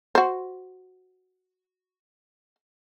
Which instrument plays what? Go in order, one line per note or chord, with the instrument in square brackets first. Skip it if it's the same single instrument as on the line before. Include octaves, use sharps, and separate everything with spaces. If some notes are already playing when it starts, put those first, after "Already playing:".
[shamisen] F#4 C5